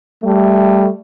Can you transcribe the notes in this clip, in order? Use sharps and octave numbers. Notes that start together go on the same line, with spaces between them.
G3 A3